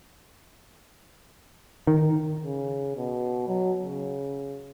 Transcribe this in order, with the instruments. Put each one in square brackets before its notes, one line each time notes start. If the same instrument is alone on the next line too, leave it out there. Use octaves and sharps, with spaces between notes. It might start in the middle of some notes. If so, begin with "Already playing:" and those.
[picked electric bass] D#3
[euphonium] C#3
B2
F#3
C#3